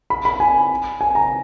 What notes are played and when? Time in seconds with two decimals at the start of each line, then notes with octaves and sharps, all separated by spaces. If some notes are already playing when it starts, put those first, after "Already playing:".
0.10 B5
0.25 B5
0.40 G#5
1.01 G#5
1.15 A#5